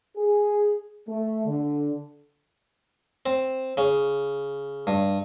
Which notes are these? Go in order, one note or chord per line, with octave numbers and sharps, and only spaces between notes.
G#4
A3
D3
C4
C#3
G2